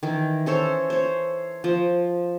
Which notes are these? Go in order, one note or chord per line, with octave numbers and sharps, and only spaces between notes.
D#3 E3
C#4 A4 C5 C#5
C5 C#5
F3